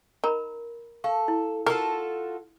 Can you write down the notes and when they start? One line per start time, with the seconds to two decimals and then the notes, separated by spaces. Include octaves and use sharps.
0.24 D#4 A#4 A#5 B5
1.04 A4 F5 C#6
1.28 E4
1.66 F4 F#4 A4 A#4